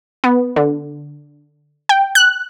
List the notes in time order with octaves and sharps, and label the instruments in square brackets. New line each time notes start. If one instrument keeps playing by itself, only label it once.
[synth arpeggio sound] B3
D3
G5
F#6